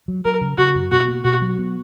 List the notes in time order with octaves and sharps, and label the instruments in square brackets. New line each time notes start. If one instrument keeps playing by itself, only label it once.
[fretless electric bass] F#3
[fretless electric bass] F#3 [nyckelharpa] A#4
[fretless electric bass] C#3
[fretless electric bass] C#3 [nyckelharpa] F#4
[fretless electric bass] F#2
[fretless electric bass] B2 [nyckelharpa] F#4
[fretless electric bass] A#3
[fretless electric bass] B2 [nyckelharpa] F#4
[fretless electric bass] F#3
B3